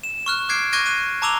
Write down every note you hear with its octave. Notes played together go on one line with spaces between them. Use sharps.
E7
C#6 F6 F#6
D6 F#6 G#6 C7 D7
C#6 D6 F#6 G#6 A#6 D#7
F#6 D#7
A5 A#5 D6 E6 F7 G7